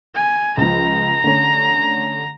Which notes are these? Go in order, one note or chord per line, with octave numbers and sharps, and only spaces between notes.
G#5
C#2 F3 A#5
D3 A3 C#4